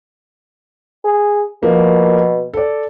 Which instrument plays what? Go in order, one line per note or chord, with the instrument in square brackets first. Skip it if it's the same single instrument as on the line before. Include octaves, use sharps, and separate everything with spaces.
[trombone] G#4
[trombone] B2 [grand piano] F3 A#3
[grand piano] A4 D5